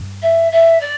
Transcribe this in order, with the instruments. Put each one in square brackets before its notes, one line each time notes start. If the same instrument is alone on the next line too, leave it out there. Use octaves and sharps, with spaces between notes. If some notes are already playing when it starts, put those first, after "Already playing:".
Already playing: [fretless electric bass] G2
[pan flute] E5
E5
D5